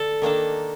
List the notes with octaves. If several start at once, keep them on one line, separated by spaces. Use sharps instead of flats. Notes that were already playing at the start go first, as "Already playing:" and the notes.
Already playing: D3 A4
D#3 A#3 D4 A4